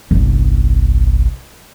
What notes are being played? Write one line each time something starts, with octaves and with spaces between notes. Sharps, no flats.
G1 C2